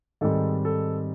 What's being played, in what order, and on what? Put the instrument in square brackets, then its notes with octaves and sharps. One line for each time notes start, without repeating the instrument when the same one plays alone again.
[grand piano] G#2 D#3 G3 C4 A4
A4